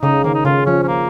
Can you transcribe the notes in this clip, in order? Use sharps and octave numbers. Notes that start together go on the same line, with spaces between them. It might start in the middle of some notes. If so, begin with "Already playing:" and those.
C#3 D#4
D#3 A#3
D#4
C#3 F4
F3 C#4
C#4
A#3